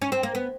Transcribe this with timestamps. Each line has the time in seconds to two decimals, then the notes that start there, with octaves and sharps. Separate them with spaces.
0.02 C#4
0.12 C4
0.23 A#3
0.35 B3